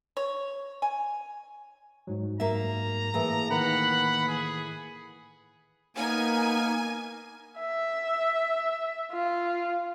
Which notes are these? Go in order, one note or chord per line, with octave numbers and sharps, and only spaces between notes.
C#5
G#5
G#2 F#3
A#3 E5 A#5
A2 E3 A#3 G#4 E5
D#3 A#3 B4 F#5 B5
G#4
A#3 B3 D#4 A#4 G#5
E5
F4